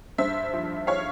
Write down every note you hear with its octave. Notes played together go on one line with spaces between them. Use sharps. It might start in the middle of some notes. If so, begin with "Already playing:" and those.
G2 C5 E5
F3
F3 C#5 F5